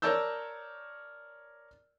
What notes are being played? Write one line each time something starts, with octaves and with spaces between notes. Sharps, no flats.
A#4 C#5 D5 A5 E6 G6